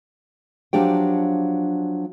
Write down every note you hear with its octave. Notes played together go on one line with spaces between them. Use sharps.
F3 F#3 D4 G4 G5